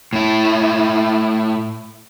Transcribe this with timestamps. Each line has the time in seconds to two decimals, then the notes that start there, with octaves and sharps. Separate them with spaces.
0.13 A2 E4